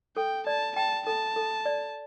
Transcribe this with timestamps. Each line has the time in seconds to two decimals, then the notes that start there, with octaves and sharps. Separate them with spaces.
0.16 A4 G5
0.47 D5 A5
0.76 G5 A5
1.06 A4 A5
1.36 A4
1.65 D5